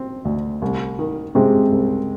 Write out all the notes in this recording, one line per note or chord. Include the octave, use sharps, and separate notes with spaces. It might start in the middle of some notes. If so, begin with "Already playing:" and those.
Already playing: C4
D2
C2
D#3
C3 G#3 C4
C2